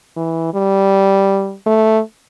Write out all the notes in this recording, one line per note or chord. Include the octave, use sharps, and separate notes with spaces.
E3
G3
A3